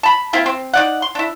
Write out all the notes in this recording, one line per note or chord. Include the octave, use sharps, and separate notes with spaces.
A5 B5
A#3 C4 E4 F4
C4
D#4 D5 F#5
C6
D4 E4